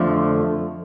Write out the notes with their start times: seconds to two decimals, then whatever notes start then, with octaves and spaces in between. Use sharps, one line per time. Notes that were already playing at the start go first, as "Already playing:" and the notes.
Already playing: F2 D3 F3 A3